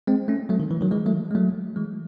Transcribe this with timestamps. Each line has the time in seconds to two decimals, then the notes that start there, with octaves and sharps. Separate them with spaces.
0.07 G#3 C4
0.28 A3 C#4
0.49 F#3 A3
0.60 D#3
0.71 E3
0.81 D#3 F#3
0.91 E3 G#3
1.06 F#3 A3
1.31 G#3
1.35 F#3 A3
1.76 E3 G#3